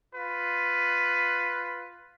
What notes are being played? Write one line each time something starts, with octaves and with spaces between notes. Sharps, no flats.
F4 B4